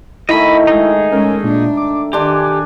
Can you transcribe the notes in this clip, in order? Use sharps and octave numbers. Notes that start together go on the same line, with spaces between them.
D#3 A3 E4 D#5 B5
G#3 D#4 G#4
G#3 C#4 A#4
A#2 D4
D6
D#3 D4 G4 G#5 C6